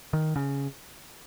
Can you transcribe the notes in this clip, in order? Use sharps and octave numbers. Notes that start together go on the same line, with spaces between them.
D#3
C#3